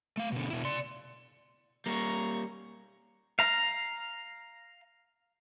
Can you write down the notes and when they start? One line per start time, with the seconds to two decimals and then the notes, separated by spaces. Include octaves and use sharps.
0.17 A3 F5
0.32 B2 D3
0.50 B2 E4
0.65 D5 C6
1.86 G3 A#3 A#5 C#6
3.39 F5 A#5